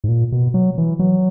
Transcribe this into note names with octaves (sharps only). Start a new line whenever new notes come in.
G#2
A#2
B2
F#3
E3
F#3